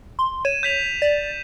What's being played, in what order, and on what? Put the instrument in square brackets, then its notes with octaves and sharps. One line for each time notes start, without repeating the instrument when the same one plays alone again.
[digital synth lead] C6
[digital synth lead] C#5 [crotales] D#7 E7
[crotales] G6 B6 F7
[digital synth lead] D5